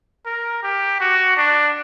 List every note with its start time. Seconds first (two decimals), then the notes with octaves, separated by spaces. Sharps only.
0.26 A#4
0.63 G4
1.00 F#4
1.37 D4